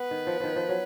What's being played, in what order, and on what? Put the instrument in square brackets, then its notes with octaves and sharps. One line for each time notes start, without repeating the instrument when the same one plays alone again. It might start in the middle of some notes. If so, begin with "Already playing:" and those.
Already playing: [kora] B3 [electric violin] B4
[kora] D#3
F3
D#3 F3
F3
F#3